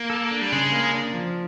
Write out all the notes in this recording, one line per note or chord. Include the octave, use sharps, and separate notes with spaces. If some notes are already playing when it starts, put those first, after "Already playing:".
Already playing: A#3
A4
D4
G3
C#3 G#3
A#3
D4
F3